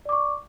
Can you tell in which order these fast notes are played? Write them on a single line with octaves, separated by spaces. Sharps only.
D5 D6 C#6